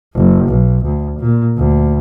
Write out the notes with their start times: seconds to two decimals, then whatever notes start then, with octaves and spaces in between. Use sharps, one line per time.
0.15 F#1
0.48 B1
0.84 D2
1.20 A#2
1.58 D2